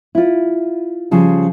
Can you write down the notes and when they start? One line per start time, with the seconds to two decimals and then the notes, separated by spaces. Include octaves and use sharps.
0.15 E4 F4
1.11 C#3 F3 G3